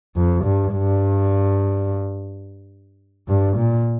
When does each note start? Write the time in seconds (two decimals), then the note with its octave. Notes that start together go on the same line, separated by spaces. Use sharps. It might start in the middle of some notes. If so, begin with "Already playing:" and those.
0.16 F2
0.44 G2
0.73 G2
3.28 G2
3.58 A#2